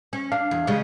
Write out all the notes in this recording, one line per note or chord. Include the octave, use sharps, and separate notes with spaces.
C#4
D4 F5
E2
C#3 G3 G#3